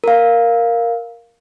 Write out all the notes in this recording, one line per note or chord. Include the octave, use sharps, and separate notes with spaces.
A#4 F5